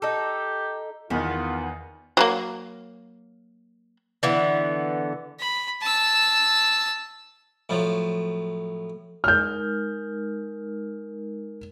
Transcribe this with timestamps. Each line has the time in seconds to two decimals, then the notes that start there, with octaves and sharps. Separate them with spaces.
0.02 D#4 G4 A4
1.10 E2 D#3 B3 F4
2.17 F#3 G3 A#3
4.23 D3 E3 B3
5.40 B5
5.82 A5 E6
7.69 A2 F3 F#3
9.24 G#3 D#4 A#4 F6 G6